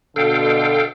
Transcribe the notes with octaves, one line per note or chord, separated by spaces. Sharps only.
B2 D3 A4 F5 G5